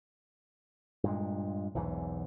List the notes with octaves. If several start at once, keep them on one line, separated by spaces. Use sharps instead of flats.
G2 A#2 G#3
B1 E2 G#2 E3